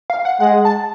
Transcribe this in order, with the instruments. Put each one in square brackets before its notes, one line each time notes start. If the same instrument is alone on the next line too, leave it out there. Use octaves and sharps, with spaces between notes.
[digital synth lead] F5
F#5
[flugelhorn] G#3 [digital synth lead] F#5
[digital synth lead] A5